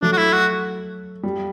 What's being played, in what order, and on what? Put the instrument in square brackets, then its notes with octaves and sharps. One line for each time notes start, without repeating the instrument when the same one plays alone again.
[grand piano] F#3 A3 [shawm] D4
[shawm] F#4
E4
F#4
[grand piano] G3